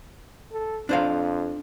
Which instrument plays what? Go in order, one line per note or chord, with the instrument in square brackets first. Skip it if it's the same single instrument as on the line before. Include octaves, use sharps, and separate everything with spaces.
[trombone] A4
[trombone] F2 [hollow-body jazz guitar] D4 C5 F5